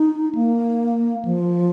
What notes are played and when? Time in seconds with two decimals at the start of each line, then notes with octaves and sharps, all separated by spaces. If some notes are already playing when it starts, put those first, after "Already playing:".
Already playing: D#4
0.35 A#3
1.25 F3